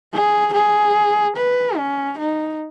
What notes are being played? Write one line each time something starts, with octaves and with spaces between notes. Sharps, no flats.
G#4
G#4
B4
C#4
D#4